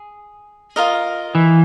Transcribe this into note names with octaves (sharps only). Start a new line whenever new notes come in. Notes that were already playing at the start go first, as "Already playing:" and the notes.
Already playing: G#4
F4 A#4 D#5
E3